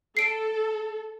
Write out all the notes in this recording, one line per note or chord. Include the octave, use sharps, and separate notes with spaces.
A4 C7 D7